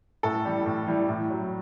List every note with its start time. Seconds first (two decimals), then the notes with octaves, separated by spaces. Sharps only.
0.23 A2 A4
0.45 E3 G3
0.66 A2
0.87 E3 G3
1.09 A2
1.30 F#3